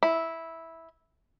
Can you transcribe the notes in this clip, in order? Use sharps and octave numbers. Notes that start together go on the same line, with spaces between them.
E4